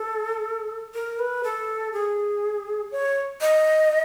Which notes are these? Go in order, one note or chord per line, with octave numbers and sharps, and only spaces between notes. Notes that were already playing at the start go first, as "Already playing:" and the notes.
Already playing: A4
A#4
B4
A4
G#4
C#5
D#5